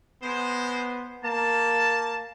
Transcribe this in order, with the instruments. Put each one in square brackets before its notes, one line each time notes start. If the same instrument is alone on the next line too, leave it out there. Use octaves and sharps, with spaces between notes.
[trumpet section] G#3 C5 [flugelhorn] B3
[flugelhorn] A#3 [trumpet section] A5